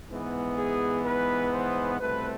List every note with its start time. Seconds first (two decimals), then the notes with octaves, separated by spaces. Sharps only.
0.10 G#2 E3 B3
0.58 G#4
1.05 B4
1.52 C5
1.99 C2 B2 A3 C4 B4